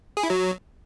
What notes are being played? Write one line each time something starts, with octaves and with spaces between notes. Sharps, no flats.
G#4
E4
F#3